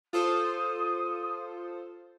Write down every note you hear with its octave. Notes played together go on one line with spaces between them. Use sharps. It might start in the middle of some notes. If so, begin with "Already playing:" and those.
F4 A4 C5 D#6